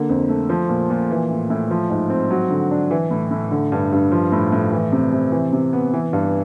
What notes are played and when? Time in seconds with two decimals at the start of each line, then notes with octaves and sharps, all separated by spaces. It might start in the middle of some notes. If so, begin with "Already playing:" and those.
Already playing: D3 A#3
0.09 F2
0.29 A3
0.49 F3
0.69 A#2
0.90 A#2
1.10 E3
1.30 A2
1.50 A2
1.71 F3
1.90 G#2
2.10 C4
2.31 F#3
2.51 D3
2.71 D4
2.91 E3
3.11 A2
3.31 A2
3.51 D3
3.72 G2
3.92 G2
4.12 F3
4.32 A2
4.52 A2
4.72 E3
4.92 C3
5.12 C3
5.32 E3
5.53 C3
5.73 B3
5.93 E3
6.13 G2